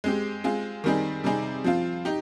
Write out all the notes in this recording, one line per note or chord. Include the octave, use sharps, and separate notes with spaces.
G#3 C4 G4
G#3 C4 F4 G#4
D#3 G3 C4 D#4 G#4
C3 G3 C4 D#4 G#4
F3 C4 F4
D#4 G4